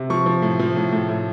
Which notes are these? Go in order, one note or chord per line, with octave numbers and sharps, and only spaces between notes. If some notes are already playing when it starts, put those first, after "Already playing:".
Already playing: C3
F3 C#6
F3
A2
F3
A2
A2
A2